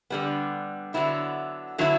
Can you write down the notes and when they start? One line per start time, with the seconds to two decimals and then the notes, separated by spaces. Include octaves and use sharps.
0.10 D3 G3 B3
0.94 D3 F#3 B3 E4
1.78 D3 F#3 B3 E4